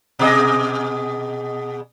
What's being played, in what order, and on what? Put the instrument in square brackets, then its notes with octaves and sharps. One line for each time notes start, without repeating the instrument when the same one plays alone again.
[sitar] B2 G#4 D#5